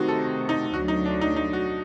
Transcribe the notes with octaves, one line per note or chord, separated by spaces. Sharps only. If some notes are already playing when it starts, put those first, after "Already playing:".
Already playing: C3 D#3 A3 C4 D#4 F#4
A4
D#4
D2 D3 F#3 F#4
D#4
D4
D#4
D#4
F#4